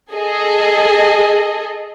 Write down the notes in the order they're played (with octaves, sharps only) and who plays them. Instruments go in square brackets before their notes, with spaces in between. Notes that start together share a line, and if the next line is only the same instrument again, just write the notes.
[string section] G#4 A4 D#5